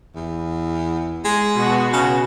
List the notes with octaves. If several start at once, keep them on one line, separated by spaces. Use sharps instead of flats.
E2
G#3
B2 F#4
C#3